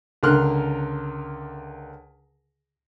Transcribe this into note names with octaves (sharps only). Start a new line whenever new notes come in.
C#2 D3 A#4 C6 F6 F#6